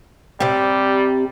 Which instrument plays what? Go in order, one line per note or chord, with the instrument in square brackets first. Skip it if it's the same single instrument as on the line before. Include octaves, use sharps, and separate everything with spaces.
[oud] C3 G4 [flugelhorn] G3